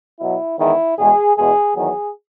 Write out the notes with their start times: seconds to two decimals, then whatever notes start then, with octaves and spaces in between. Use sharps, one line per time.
0.19 B2 F#3 E4
0.59 E2 D#3 G#3 E4
0.97 E2 B2 G#3 G#4
1.37 E2 B2 G#3 G#4
1.75 E2 D#3 F#3 G#4